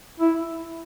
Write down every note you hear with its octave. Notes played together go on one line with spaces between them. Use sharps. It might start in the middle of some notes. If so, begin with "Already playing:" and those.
E4